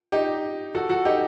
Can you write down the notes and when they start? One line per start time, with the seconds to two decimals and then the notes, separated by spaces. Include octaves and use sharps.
0.12 D#4 G4
0.75 F#4 A4
0.89 F#4 A4
1.05 D#4 G4